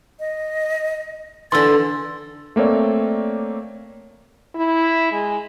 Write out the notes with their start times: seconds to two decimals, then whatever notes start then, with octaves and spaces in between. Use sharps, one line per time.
0.20 D#5
1.52 D3 E3 C6 E6 A6
2.56 A3 A#3 C4 C#5 D5
4.55 E4
5.12 G#3